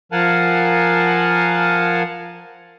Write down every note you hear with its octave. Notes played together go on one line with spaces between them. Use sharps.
F3 A#4 F5 F#5 G#5 A5